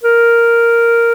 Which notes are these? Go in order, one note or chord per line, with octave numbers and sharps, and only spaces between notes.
A#4